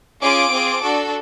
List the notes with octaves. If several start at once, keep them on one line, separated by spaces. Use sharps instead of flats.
C#4 F4 G#4 D6
C4 F4 G#4
D4 F#4 A4